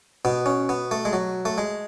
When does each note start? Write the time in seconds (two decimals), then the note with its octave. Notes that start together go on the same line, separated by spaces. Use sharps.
0.25 B2 B3
0.46 C#4
0.69 B3
0.91 A3
1.05 G#3
1.13 F#3
1.45 A3
1.58 G#3